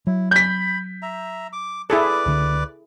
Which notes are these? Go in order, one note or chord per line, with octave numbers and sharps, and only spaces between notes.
F#3 E4
B5 G6 B6
E5 A#5
D6
E4 G#4 A4 B4 D5 D6
C#2 D3